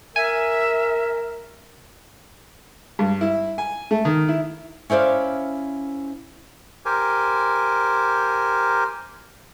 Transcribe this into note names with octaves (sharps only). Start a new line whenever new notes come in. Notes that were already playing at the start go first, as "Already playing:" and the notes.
A#4 E5 G#5
G2
E4
G#5
A3
D#3
E4
C#4 E4 C5 D5 F5
G4 A#4 C5 G#5